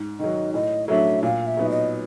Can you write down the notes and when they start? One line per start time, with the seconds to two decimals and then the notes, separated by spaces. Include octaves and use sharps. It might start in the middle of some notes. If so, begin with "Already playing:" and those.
Already playing: G#2
0.20 D#3 F#3 D#5
0.54 A2 D#5
0.88 F#3 A3 D4 E5
1.23 A#2 F5
1.47 E5
1.57 F#3 B3 D#4
1.69 D#5